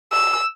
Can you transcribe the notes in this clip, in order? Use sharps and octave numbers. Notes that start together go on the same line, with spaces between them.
E6